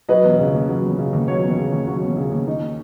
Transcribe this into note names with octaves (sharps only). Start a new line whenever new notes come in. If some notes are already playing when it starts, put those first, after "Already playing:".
F#3 B4 D#5
E1
C#3
D#2
F#3
E1
C#3
D#2
F#3 C#5
E1
C#3
D#2
F#3
E1
C#3
D#2
D#4